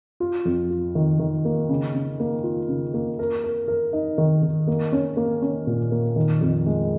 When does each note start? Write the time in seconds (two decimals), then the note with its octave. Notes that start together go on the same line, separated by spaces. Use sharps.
0.20 F4
0.45 F2
0.70 F4
0.95 D#3
1.19 D#3
1.45 A#3
1.69 C#3
1.94 C#3
2.20 A#3
2.43 F4
2.68 C#3
2.94 A#3
3.19 A#4
3.44 A#4
3.68 A#4
3.93 D#4
4.18 D#3
4.43 D#3
4.67 A#3
4.92 C#4
5.17 A#3
5.42 C#4
5.67 A#2
5.92 A#3
6.16 D#3
6.41 F2
6.66 G#3